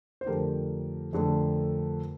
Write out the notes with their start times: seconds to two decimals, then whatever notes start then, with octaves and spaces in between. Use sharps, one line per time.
0.21 C5
0.26 F2 D3 A3 G4 A#4
1.13 F2 D3 A3